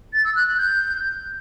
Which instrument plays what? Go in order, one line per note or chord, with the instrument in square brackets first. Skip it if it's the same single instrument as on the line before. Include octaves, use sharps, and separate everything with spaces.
[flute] A6
E6
F#6
F#6
G6